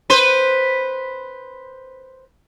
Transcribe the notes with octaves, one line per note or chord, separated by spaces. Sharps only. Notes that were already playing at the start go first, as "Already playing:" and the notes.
B4 C5